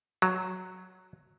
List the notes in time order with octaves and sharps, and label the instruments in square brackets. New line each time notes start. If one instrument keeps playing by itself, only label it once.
[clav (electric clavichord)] F#3